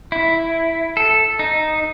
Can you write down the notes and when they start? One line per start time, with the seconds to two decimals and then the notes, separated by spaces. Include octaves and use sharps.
0.12 E4
0.97 A4
1.39 D#4